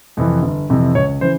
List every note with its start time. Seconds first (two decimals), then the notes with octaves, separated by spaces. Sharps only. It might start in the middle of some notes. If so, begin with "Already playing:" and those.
0.17 F2 C3 E3
0.43 G1
0.70 F2 C3 E3
0.95 C#2 C#5
1.21 C#3 E3 C5